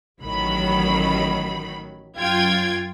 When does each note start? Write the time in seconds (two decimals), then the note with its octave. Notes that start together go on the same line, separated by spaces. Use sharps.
0.20 A1 D#3 F#3 B5
2.18 F#2 F4 G5 G#6